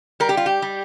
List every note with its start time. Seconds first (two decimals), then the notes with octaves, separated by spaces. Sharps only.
0.20 G3 A#4
0.29 G4
0.37 F4
0.46 G4
0.62 G3